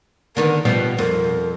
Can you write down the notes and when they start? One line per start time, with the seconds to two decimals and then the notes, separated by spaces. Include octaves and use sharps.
0.37 D3 D#3 B3 A#4
0.65 B2 F3 G3 B4
0.99 F2 A#4